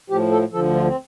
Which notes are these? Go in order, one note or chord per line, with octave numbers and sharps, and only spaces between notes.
A2 F3 G4
A4
D2 D3 F3 A4
F4
C4